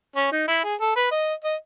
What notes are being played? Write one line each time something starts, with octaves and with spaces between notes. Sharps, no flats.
C#4
D#4
E4
G#4
A4
B4
D#5
D#5